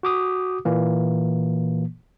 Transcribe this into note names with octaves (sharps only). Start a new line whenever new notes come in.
F#4 D6 D#6
A#2 E3 A#3